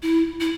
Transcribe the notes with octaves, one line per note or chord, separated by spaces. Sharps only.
E4
E4